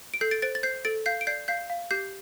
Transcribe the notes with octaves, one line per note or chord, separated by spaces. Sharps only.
D7
A4 G6 C7
A6 D7
C5 A6 D7
A6
C5 G6 C7
A4 A6 D7
F5 G6 C7
D7
D5 G6 C7
F5 G6 C7
F5
G4 G6 C7